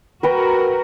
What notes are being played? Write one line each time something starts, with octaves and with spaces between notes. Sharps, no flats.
F#4 A#4 B4 G5 A#5